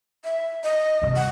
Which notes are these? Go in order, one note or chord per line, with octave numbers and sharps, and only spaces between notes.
E5
D#5
G2 C3
F#5